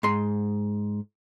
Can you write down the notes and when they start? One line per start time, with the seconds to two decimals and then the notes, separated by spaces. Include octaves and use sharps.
0.03 G#2 C6